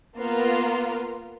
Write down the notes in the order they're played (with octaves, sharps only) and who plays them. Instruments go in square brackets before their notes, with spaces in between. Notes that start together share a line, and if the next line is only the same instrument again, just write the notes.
[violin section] A#3 B3 F4 A#4